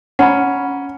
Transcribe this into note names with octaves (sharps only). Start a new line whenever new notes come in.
C#4 F#5 A#5 B5